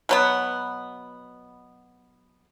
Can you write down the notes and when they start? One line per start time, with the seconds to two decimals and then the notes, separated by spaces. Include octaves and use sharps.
0.09 B2 F#3 B3